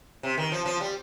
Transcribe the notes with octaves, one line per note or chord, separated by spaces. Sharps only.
C3
D#3
F3
F3
G3